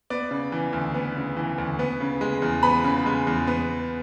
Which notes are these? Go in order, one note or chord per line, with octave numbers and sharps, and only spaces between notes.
B3 D5
C#3
E3
D2
B3
C#3
E3
D2
B3
C#3
G#3
E2
B3 B5
C#3
G#3
E2
B3